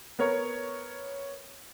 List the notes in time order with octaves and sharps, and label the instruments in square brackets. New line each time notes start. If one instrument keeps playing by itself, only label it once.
[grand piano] B3 A#4 C#5